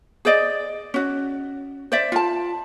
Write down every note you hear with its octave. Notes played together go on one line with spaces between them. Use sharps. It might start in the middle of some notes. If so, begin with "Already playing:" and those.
G#4 C5 D5 D#5
C#4 F#4
C5 D5 E5
F4 A5